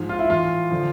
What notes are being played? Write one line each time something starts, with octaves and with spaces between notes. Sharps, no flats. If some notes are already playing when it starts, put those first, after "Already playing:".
Already playing: G#2 F3
F4
E4
A2 E3 F4
D3 F3